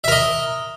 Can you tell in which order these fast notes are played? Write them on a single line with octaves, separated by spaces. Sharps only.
E5 A#4 D#5